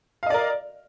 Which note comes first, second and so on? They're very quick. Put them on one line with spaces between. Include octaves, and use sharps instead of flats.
F5 D#5 D5 A#4